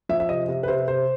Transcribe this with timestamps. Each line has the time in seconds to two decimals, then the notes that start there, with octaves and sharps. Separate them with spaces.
0.09 F3 E5
0.20 E5
0.29 C3 D#5
0.48 C3
0.63 B4
0.68 C3 C5
0.88 C3 C5